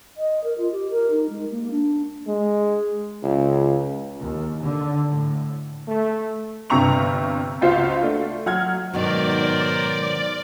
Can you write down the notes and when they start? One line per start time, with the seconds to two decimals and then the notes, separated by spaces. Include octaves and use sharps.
0.17 D#5
0.44 A#4
0.58 F4
0.72 G4
0.90 A#4
1.11 D#4
1.30 G#3
1.51 A#3
1.71 D4
2.28 G#3
3.24 C#2
4.20 D#2
4.63 D3
5.09 A2
5.88 A3
6.70 G1 G2 C3 A#5 C#6 F7
7.61 C#2 F4 F#4 C5 F5
8.02 A3 D4
8.46 F#3 F#5 F6 G#6
8.93 G#2 B2 D#3 F#3 A#4 C5 D5